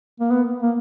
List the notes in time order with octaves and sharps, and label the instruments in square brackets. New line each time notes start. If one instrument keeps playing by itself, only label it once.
[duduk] A#3
B3
A#3